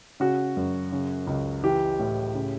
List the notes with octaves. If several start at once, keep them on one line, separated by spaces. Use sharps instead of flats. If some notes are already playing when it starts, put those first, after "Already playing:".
C#3 F#4
F#2
C#3
C#2
E3 G4
A2
C#3